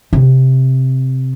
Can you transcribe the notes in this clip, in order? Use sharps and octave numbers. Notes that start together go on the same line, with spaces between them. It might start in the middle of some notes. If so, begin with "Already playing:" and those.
C3